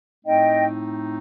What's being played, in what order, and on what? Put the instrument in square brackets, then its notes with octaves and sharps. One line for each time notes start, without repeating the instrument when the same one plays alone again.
[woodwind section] A2 A3 C4 D#4 [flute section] D#5 G5